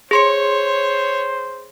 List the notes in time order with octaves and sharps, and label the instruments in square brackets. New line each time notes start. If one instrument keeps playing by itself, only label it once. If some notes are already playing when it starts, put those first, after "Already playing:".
[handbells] G#4 C6 C#7 [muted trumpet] C5 [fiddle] C#5